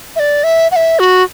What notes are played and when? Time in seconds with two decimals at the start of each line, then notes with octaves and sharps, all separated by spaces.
0.16 E5
0.19 D5
0.44 E5
0.71 F#5
0.76 E5
0.99 F#4